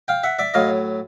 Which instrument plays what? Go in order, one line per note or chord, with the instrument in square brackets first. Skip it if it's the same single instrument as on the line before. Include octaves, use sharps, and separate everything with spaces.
[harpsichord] F5 G5
E5 F#5
D5 E5
A2 F#3 D#5 F5